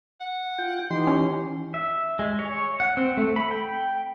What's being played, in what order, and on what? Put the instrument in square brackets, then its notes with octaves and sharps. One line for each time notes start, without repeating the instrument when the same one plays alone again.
[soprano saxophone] F#5
[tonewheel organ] F4 G5
[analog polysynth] E3 [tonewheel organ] D#4 G4 [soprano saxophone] C6
[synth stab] C#4
[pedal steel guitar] E5
G#3
C#5
F#5
C4
A3
B5
G5